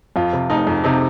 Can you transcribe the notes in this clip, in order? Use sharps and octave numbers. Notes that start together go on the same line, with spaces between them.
F2 F4
C3
F1 D#4
F2
C3 D#4